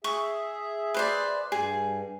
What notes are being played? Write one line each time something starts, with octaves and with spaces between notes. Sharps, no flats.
G#4 E5 C#6
B4 C5 D5
G2 G#4